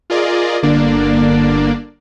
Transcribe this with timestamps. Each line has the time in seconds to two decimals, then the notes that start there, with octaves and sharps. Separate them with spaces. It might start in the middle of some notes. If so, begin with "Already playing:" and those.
0.10 F4 G#4 A#4 D5 D#5
0.63 G1 D3 A#3 D4 D5